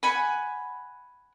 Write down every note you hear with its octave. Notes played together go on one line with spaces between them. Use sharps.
F#5 G#5 B5